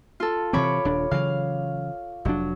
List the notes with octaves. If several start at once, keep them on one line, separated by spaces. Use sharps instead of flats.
F4 A4
C3 E3 C4 C#5 B5 D6
D#1 D4
C#3 E3 F#3 F5
F1 F#3 D4